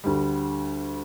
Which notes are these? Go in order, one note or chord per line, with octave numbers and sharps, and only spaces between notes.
D2 D3 G3